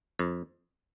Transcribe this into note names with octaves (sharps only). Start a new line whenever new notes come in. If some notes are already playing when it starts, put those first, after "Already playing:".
F2